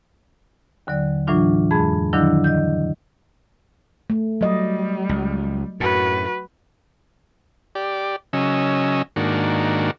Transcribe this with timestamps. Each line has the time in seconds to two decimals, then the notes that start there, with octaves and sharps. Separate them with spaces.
0.87 D#2 D3 F#3 D5
1.27 A2 E3 F#3 D4 F4
1.71 F2 G#3 G#4 B5 G#6
2.13 D3 D#3 F3 F#3 D4 E4
2.44 D#5 G6
4.10 A3
4.41 F#3 G3 D#5
5.09 C#2
5.80 F#2 A2 F#4 B4
7.75 G4 D5
8.33 C#3 F#3 C#4 D#5 E6
9.16 G#2 D#3 A#3 D4 F#4